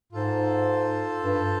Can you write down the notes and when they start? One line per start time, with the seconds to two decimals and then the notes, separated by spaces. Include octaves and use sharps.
0.12 G#2 F4 A4 C5
1.21 G2